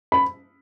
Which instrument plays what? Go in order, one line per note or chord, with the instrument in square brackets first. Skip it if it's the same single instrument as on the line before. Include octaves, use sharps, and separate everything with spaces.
[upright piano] B5